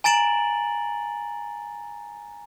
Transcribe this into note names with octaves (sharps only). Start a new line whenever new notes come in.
G#5 A#5 A6 D7 E7 F#7